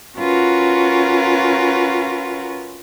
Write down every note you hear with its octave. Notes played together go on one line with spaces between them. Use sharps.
C#4 F4 F#4 A#4 B4